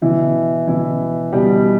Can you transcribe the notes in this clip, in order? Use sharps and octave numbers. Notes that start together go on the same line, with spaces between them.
B2 E3 E4
B2 E3 E4
B2 G3 G4